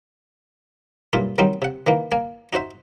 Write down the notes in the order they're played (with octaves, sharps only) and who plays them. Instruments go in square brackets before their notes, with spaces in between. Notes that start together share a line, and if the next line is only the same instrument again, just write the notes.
[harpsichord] B1 G2 A#2 F4 E5
D#3 F#3 G3 C4 D#4
C3 F#5
D#3 E3 A#3
A#3 G#5
D#4 F#4 C5 E5